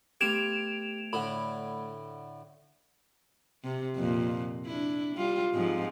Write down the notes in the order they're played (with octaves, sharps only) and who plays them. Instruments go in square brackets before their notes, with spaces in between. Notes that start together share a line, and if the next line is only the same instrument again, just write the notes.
[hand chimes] A3 B3 G#6 [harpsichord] G4 [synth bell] D7 E7 F7
[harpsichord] A2 D3 [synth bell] B5
[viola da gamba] C3
F2 A#2
D4 E4
G3 F4
G#2 F3 C4